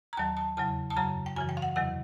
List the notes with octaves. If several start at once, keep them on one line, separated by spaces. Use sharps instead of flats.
A#5
D#2 D#3 F#3 A5
A5
E2 C#3 F#3 A5
A5
F#2 C#3 F#3 A#5
G5
F#2 C#3 E3 G#5
G5
F5
F#5
E2 C3 D#3 F#3 F#5